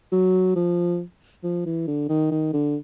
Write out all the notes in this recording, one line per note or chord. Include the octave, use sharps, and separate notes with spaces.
F#3
F3
F3
E3
D3
D#3
D#3
D3